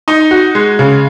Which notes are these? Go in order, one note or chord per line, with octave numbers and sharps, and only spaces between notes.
D#4
F#4
G#3
C#3